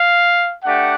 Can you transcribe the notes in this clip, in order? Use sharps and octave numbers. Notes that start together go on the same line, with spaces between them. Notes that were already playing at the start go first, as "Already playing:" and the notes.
Already playing: F5
A3 D4 G4 F#5